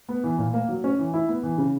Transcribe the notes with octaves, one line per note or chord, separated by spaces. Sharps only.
B3
E3
A#2
A#3
F#3
C#4
E3
E4
B3
E3
C#3